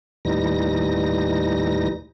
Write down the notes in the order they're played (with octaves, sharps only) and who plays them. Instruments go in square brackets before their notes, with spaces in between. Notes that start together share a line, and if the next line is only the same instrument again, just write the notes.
[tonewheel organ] D#2 A2 E3 G3 D#4 A#6